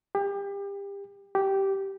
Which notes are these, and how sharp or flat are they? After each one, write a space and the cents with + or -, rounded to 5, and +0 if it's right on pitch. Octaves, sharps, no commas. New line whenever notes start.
G4 +30
G4 -10